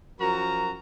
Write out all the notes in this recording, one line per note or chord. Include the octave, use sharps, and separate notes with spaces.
F#2 F3 F#4 A#4 A#5